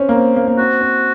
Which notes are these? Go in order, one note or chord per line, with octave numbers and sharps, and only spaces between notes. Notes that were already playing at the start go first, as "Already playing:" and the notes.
Already playing: C4 C#4
A#3
C4
A#3
A#3
C4 F#4
C4